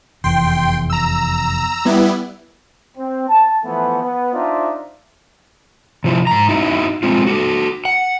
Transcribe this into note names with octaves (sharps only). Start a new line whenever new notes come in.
F1 E2 G5 C6
A#5 E6
G3 B3 E4
C4
A5
E3 F3 A3 B3
B3
D4 D#4 F4 C5 D5 E5
C3 F3 E4
G#2 A#5
D#4 E4 F#4
G#3 C4 F4
F#4 G#4 A4
F#5